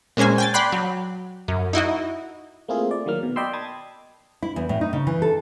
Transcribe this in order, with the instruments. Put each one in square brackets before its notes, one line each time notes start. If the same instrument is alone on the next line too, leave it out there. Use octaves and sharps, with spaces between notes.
[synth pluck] A#2 G#3 C#4 C5 G#5
G5 G#5 A6
D5 G5 B5 C6 F#6
F#3
F#2
D#4 E4 F#4 D#5
[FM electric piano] A3 A#3 C4 E4 F4 G#4
D5
D#3 F#3 A#3 F6
B2
D5 D#5 G5 B5 C6 E6
A5 B5 D#6 G#6 A6
[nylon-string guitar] E4
E2
A2
D#4
C#3
E3
A4